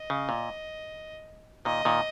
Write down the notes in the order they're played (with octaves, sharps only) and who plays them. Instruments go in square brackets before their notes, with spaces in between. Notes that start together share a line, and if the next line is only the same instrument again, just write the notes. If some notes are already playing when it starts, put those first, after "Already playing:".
Already playing: [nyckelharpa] D#5
[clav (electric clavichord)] C#3
A#2
[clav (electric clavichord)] A#2 D#3 [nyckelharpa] D#5
[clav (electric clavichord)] A#2 D#3